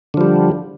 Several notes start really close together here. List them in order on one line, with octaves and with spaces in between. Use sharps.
D3 F3 G3